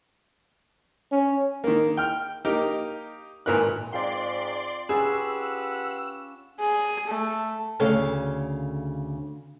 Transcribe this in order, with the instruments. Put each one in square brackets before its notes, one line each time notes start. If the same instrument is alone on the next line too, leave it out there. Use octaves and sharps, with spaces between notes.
[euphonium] C#4
[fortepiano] D#3 A#3
G5 F6
A#3 D#4 G4 A#4
G#1 A#2 A#4 B4 F#6
[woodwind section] G#2 [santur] C4 F4 G5 [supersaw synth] D5 C6
[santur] C#4 D5 B5 [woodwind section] G4 B4 F#5 [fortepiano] G#4 [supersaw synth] E6
[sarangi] G#4
A3
[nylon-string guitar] D2 C#3 A4 C#5 F5 A5